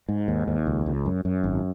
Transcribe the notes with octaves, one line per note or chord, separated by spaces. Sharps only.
G#2
D#2
D#2
C#2
C#2
F#2
F#2
G#1